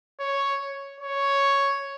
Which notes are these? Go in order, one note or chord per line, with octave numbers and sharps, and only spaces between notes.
C#5
C#5